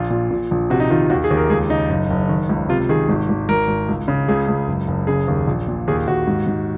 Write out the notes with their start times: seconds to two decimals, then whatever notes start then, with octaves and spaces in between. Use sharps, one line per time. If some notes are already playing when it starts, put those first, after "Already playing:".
Already playing: A#1 F4
0.10 A#2
0.31 A#2
0.51 A#1
0.70 C3 F#4
0.80 D#4
0.90 D#3 F4
1.10 D#2 F#4
1.24 G#4
1.30 D#2
1.37 A#4
1.50 C#2 G#4
1.70 C#3 D#4
1.89 F#1
2.10 F#1
2.29 D#3
2.49 C#2
2.69 C3 F4
2.89 D#3 G#4
3.09 G#1
3.29 G#1
3.49 G#1 A#4
3.68 G#1
3.89 C#2
4.08 C#3
4.28 C#2 G#4
4.48 C#2
4.68 F#1
4.88 F#1
5.07 C#3 G#4
5.28 D#2
5.47 A#1
5.68 A#2
5.88 D#2 G#4
6.07 D#2 F#4
6.27 G#2
6.47 G#2